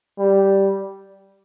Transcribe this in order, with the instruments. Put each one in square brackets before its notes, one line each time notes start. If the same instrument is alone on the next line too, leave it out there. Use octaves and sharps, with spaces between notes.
[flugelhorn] G3